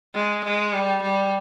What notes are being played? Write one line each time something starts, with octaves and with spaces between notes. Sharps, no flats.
G#3
G#3
G3
G3